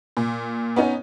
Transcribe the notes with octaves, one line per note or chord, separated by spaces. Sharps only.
A#2
B3 C#4 D#4